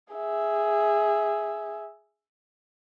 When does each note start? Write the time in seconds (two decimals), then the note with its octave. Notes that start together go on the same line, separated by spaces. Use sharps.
0.14 G#4 E5